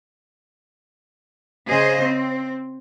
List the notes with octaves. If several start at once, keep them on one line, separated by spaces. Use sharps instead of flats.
C#3 G#4 C5 D#5
C4